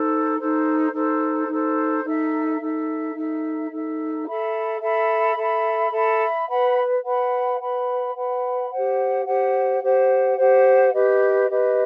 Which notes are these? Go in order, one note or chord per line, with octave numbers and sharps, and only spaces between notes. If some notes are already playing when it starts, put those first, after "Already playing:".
Already playing: D#4 A4 C5
D#4 A4 C5
D#4 A4 C5
D#4 A4 C5
D#4 A4 E5
D#4 A4 E5
D#4 A4 E5
D#4 A4 E5
A4 E5 B5
A4 E5 B5
A4 E5 B5
A4 E5 B5
B4 F#5 B5
B4 F#5 B5
B4 F#5 B5
B4 F#5 B5
G4 C5 F#5
G4 C5 F#5
G4 C5 F#5
G4 C5 F#5
G4 B4 D#5
G4 B4 D#5